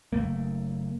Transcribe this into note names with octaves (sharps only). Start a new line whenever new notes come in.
F#1 A2 A3 A#3